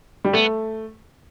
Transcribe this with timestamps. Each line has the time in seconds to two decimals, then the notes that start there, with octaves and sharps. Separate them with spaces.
0.25 G3
0.33 A3 B3